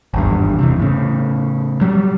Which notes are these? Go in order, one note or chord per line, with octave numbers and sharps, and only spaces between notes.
G#1 E2 G2
C3 E3
A2 C#3
F#3 G3